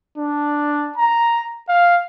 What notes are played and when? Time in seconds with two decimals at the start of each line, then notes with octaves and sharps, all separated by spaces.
0.18 D4
0.98 A#5
1.69 F5